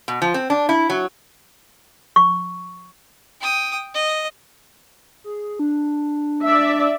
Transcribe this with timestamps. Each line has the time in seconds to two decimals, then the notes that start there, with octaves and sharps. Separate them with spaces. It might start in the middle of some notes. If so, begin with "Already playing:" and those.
0.08 B2
0.22 F3
0.34 C4
0.50 D4
0.69 E4
0.90 F#3
2.16 C#6
3.40 G5 D#6
3.95 D#5
5.24 G#4
5.59 D4
6.44 D5 E5